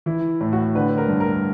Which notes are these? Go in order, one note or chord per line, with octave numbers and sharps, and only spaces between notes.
E3 E4
A2
F#4
D3 B4
A#4
G2
A#4